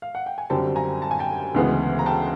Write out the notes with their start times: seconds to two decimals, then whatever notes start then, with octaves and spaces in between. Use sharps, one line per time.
0.02 F5
0.15 F#5
0.26 G5
0.38 G#5
0.50 F#2 D3 G3 C4 G5 A5
0.76 G#5 A#5
1.02 A5
1.11 G#5
1.19 G5 A5
1.54 D2 C#3 E3 G#3 B3
1.99 A#5
2.06 G5 A5